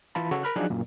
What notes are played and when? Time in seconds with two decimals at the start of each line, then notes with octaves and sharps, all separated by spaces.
0.15 E3 F4 A5 B5
0.31 C#3 F#4 A4 C#5
0.43 A#4 A#5 B5 F6 F#6
0.56 F3 F#3 D4 D#4 G#4 F#6
0.70 F#2 A#2